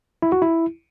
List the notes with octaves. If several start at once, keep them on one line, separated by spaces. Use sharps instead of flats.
E4
F#4
E4